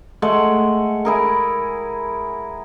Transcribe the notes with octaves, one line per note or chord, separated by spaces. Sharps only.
G#3 A3 F#5
E4 G#4 A#4